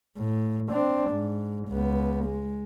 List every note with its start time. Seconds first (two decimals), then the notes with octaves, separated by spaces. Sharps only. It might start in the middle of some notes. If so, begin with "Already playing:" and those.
0.18 A2
0.70 C4 D4
1.11 G#2
1.69 C#2 B3
2.26 G#3